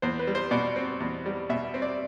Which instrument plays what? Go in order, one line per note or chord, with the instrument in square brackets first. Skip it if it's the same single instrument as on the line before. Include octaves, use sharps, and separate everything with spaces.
[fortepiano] E2 C5
B4
G3
C5
B2 D5
C4
E2
G3
B2 E5
C4
D5